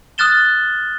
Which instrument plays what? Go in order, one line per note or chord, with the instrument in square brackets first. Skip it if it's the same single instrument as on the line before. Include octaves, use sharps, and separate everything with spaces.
[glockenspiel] D#6 F6 F#6 A6 E7 G7